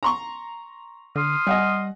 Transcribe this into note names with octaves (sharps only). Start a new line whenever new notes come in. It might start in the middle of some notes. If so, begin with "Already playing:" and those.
A#5 C6 C#6
D3 C6 D#6 F6
G3 D#5 F#5 G#5